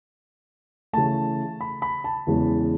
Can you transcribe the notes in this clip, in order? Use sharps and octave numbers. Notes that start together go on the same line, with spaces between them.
C#3 E3 A3 A5
B5
B5
A5
E2 C#3 E3 G#3 B3